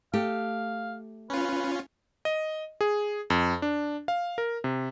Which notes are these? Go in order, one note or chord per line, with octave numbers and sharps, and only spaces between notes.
A3 G4 F5
C#4 F4 B4
D#5
G#4
F2
D4
F5
A#4
C3